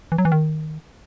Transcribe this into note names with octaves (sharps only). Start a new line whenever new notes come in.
E3
F#3
E3
D#3